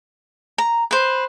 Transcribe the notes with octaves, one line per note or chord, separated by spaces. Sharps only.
A#5
B4 C5